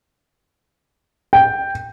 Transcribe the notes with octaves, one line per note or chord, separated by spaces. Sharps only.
G5